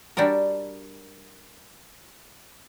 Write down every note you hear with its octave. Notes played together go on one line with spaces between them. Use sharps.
G3 D4 F#4 A#4